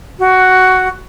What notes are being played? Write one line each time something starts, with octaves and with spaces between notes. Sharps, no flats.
F#4